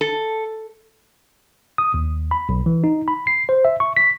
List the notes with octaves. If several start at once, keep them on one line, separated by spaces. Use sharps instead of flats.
A4
D#6
D#2
B5
B1
E3
D#4
B5
C7
C5
E5
C#6
B6